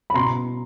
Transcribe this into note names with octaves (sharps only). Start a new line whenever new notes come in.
B5
B2 A#5 C6